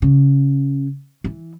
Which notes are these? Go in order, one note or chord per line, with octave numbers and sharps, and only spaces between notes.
C#3
E3